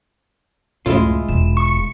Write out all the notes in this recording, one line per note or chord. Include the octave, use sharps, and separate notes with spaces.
C#2 F#2 A2 G#3 E4 F4
E1 E7
C#6